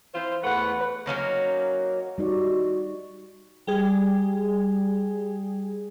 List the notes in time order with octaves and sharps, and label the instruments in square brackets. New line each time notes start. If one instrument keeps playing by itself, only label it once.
[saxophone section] E3 F4 C5
[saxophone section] E2 A3 F#5 [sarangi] B4
[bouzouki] F#3 A#3 C#4 D#4
[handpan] G3 D#4 D5 [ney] F#4
[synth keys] G3 G#4